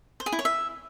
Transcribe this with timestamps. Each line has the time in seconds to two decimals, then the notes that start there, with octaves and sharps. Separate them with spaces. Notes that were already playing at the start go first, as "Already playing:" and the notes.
0.20 C5
0.26 G#4
0.32 E4
0.39 C#5
0.45 E5